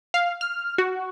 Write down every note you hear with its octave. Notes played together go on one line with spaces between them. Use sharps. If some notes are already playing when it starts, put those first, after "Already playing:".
F5
F6
F#4